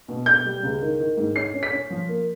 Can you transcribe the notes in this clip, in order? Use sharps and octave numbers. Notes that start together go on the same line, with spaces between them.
B2
B2 G6
G3
C#2
D#3
D#3
G#2
C#4 C7
C#4
B6
C#4
F3
A#3